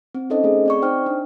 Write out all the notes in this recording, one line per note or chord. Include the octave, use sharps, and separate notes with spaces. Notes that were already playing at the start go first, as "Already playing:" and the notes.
C4
C#4 D#4 A4 C5 D#5
A3 G#4
C4 D5 C#6
D#4 C5 G5 F6
D4